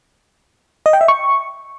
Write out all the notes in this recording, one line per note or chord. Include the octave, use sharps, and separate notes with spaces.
D#5
G5
E5
C#6